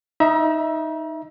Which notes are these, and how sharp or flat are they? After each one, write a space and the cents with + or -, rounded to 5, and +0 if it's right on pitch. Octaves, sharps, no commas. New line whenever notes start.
D#4 +0 E5 +0 A#5 +40